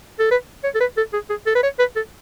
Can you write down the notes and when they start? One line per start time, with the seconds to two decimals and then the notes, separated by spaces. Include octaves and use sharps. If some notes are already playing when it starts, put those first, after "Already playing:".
0.19 A4
0.31 B4
0.64 C#5
0.75 A4
0.80 B4
0.97 A4
1.13 G#4
1.30 G#4
1.46 A4
1.55 B4
1.63 C#5
1.79 B4
1.96 A4